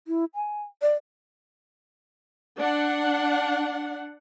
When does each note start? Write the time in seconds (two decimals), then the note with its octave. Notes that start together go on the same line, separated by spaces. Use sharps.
0.08 E4
0.35 G#5
0.82 D5
2.58 D4 F#5